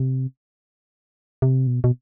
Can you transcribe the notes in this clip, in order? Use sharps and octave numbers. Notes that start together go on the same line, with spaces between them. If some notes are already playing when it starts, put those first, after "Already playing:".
Already playing: C3
C3
B2
B2